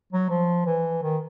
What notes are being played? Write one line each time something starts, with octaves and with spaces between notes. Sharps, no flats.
F#3
F3
E3
D#3